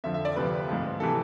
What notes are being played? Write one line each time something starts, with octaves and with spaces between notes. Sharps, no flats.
F2 D3 F3 E5
E5
D5
D2 C3 F3 B4
G#2 F3
C3 E3 A4